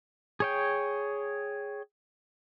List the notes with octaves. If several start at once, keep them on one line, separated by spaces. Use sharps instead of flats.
G#4 C#5 G5